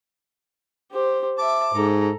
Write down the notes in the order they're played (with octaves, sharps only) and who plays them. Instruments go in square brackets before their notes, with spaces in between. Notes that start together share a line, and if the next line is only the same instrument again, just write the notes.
[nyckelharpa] G4 C5
[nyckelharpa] E5 A5 [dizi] D6
[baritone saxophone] G#2 [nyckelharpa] A4 A#5